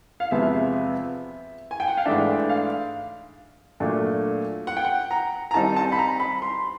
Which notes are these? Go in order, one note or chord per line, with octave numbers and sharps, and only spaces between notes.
F5
E2 C3 F3 G#3 B3 E5
G#5
G5
F#5
F5
G#2 E3 A3 D4 E5
F5
A#2 F#3 A3 D4
F#5
G5
F#5
A#5
A#5
D#3 G3 C4 D#4 A5
A5
B5
A#5
B5
C6